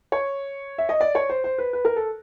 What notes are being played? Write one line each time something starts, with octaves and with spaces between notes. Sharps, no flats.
C#5
E5
D#5
D5
C#5
C5
C5
B4
B4
A#4
A4